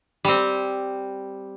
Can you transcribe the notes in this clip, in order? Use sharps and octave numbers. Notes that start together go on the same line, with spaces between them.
G3 C4